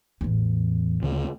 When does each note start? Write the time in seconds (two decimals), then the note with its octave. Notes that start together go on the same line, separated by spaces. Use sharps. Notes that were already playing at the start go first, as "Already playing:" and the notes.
0.21 A1 E2
1.03 D2 C#3